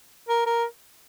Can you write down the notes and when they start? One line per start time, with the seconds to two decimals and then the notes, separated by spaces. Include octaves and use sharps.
0.29 A#4
0.46 A#4